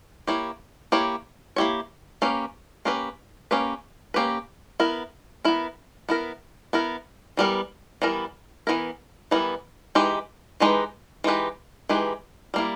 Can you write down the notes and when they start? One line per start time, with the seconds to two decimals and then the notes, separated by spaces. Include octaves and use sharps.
0.27 A#3 E4 G4 C#5
0.92 A#3 E4 G4 C#5
1.56 A#3 E4 G4 C#5
2.22 A#3 C#4 G4 B4
2.85 A#3 C#4 G4 B4
3.51 A#3 C#4 G4 B4
4.14 A#3 C#4 G4 B4
4.80 B3 E4 A#4
5.45 B3 E4 A#4
6.09 B3 E4 A#4
6.73 B3 E4 A#4
7.37 E3 G3 B3 E4 A#4
8.02 E3 G3 B3 E4 A#4
8.67 E3 G3 B3 E4 A#4
9.31 E3 G3 B3 E4 A#4
9.95 E3 G#3 D#4 G4 B4
10.60 E3 G#3 D#4 G4 B4
11.24 E3 G#3 D#4 G4 B4
11.89 E3 G#3 D#4 G4 B4
12.54 G3 A#3 E4